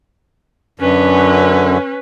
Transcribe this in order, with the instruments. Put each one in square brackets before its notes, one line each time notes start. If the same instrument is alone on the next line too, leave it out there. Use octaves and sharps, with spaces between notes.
[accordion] F#2 D3 [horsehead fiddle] C#4 B4